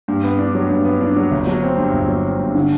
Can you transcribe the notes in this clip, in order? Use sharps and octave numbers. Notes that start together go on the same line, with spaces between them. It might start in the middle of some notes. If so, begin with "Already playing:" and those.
G2
B3
D4
F#3
G2
B3
D4
F#3
G1
F#3
C4
G2
G1
F#3
C4
G2
D3